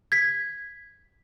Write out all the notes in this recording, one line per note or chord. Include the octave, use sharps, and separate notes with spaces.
G#6 B6